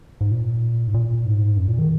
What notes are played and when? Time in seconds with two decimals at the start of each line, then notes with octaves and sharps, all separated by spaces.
0.21 G#2
0.32 A#2
0.88 G#2
0.94 A#2
1.25 G#2
1.57 F#2
1.68 A#2
1.78 D#3